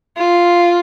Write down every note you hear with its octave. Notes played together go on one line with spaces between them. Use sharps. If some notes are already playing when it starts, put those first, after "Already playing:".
F4